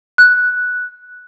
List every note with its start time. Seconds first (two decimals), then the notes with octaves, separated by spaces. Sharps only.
0.18 F#6